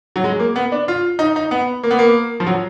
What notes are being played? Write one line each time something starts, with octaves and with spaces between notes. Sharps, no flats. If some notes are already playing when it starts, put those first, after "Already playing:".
F#3
G#3
A#3
B3
D4
F4
D#4
D#4
B3
A#3
B3
A#3
F3
F#3